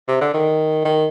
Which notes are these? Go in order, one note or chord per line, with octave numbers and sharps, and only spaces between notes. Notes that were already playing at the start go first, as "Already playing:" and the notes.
C3
D3
D#3
D#3